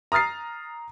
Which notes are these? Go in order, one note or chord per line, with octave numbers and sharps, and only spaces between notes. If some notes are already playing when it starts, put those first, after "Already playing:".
A#5 D#6 F6 A6 C7